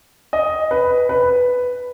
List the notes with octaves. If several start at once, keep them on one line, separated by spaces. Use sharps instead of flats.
D#5
B4
B4